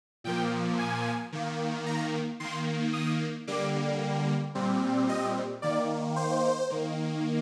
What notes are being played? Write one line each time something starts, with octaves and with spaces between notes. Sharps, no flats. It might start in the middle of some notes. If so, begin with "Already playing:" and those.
A#2 F3 A#3 G5
G#5
D#3 A#3
A#5
D#3 A#3 C6
D#6
D3 G3 A#3 D6
A#2 G3 C4
D#5
D#3 A#3 D5
C5
D#3 A#3